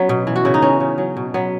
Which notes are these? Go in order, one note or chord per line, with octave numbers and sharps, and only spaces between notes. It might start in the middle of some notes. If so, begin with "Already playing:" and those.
Already playing: F#3 B3 C#4
B2
E3
F#4
C#3 E4
D#4
E3 C#4
C#3
F#3
B2
F#3 B3